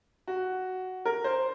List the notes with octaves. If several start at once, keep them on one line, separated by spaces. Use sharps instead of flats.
F#4
A#4
C5